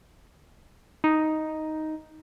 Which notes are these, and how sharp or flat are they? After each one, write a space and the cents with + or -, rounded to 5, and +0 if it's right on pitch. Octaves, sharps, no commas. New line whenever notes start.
D#4 +5